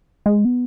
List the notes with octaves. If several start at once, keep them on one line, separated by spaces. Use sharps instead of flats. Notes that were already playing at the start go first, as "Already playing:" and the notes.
G#3
B3